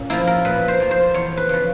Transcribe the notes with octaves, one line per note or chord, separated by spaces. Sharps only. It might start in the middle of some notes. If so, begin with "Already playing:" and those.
Already playing: A#2 C#4
F3 A#3 E4
A#4
A#2 B4
C5
F3 A#3
C5
E2 C#5
B4
C#3 F3